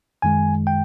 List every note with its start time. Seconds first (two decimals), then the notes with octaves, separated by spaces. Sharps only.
0.22 F#2 D#3 G#3 G#5
0.67 G5